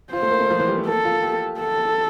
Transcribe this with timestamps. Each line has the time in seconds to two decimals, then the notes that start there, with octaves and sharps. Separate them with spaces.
0.13 F4 C5
0.22 A3
0.31 A#3
0.40 A3
0.50 F3
0.60 E3
0.68 G3
0.78 A3
0.87 A#3 A4
1.05 F4
1.23 G4
1.60 A4